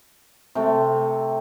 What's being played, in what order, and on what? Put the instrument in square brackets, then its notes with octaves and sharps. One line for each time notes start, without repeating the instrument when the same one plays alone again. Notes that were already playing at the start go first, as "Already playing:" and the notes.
[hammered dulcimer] C3 A3